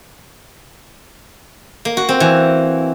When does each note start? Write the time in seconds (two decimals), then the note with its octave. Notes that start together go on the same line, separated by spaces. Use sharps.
1.85 A#3
1.97 F#4
2.09 C4
2.20 E3